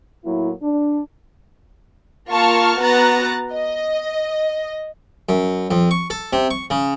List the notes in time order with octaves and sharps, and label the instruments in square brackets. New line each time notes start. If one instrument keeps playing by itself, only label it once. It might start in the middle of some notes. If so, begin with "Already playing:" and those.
[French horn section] A2 F#3 A#3 E4
D4
[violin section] A#3 F4 A5 C#6 F6
B3 F#4 A#5 F#6 A6
D#5
[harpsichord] F#2
F2
C#6
A4
C3
C#6
C#3